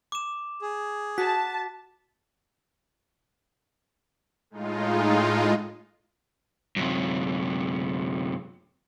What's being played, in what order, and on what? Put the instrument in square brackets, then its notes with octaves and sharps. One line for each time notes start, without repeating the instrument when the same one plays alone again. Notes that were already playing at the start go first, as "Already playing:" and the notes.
[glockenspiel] D6 E7
[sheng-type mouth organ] G#4
[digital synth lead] F#4 [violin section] A5 [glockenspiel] B6
[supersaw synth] A2 G#3 D#4 F4
[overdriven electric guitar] F#2 C3